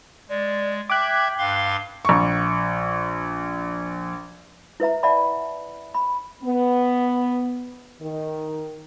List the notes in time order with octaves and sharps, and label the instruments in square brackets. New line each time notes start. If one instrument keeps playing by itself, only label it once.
[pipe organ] G#3 [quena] D5
[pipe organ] E5 G#6 [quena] G5 [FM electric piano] D6 F#6
[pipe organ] G2 F5 C6 [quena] G5
[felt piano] A#1 C#6
[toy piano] E4 B4 E5 A#5
D5 E5 F#5 A5 B5
B5
[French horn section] B3
D#3